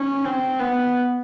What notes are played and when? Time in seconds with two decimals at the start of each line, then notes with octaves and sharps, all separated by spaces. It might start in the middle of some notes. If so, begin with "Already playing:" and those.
Already playing: C#4
0.24 C4
0.59 B3